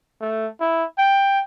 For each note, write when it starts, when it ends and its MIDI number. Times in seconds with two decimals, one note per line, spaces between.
0.21 0.48 57
0.61 0.85 64
0.98 1.42 79